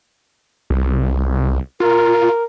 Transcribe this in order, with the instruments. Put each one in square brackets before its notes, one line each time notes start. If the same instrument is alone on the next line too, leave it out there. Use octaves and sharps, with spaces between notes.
[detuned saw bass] C2
[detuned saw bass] F4 [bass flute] A#4